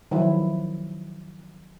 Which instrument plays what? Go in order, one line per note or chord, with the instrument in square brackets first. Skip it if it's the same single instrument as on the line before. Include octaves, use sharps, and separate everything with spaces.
[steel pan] D#3 F3 F#3 E4